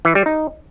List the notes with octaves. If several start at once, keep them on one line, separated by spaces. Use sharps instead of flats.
E3
G3
D#4